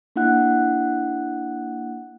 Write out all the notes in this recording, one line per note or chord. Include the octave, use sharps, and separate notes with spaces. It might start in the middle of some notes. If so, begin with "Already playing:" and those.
A#3 D4 E4 F#5 F#6